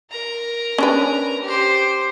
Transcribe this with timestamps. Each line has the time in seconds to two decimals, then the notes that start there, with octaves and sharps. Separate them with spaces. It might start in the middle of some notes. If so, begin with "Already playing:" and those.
0.11 A#4 A#5
0.78 C#4 D4 B4
1.42 G4 C5